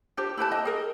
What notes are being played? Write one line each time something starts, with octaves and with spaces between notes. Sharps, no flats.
D4 F4 G4 C5
E4 G4 B4 A5
D#5 G5
G#4 A#4 D#5